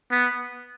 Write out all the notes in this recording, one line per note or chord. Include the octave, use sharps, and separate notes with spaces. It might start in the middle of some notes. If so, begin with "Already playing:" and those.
B3